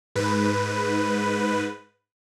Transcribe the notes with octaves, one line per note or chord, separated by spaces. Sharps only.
G#2 B4